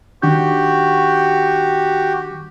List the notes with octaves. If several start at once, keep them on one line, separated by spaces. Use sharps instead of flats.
D#3 D4 F#4 G4 G6